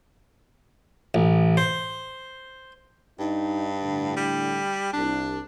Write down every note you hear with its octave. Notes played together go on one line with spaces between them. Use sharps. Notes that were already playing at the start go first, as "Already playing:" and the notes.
A1
C5
G2 D#4
A2 D3
G3
C2 D4